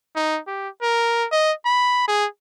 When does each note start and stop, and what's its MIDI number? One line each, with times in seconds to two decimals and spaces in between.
0.16 0.40 63
0.47 0.69 67
0.82 1.27 70
1.32 1.53 75
1.66 2.08 83
2.08 2.26 68